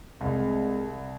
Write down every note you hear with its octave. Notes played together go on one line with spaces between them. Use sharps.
C2 G#3 C4